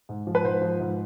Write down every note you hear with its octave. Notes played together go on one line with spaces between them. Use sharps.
G#2
F3
B4
G#2 C5
F3
G#2